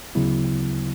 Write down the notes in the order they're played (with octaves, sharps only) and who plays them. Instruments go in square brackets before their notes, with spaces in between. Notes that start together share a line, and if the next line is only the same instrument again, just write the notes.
[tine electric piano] D2 C#3 F#3 B3 E4